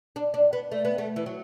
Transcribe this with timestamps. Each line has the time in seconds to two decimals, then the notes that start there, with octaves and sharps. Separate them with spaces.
0.16 D4
0.34 D4
0.53 B3
0.72 A3
0.85 B3
0.98 A3
1.16 E3
1.26 F#3